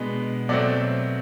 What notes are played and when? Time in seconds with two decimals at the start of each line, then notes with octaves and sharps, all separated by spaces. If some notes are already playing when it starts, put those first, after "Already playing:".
Already playing: B2 G#3 B3 D4
0.49 B2 F#3 A3 C4 D5